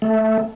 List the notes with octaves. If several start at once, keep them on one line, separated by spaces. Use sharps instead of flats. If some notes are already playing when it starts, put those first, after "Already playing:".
A3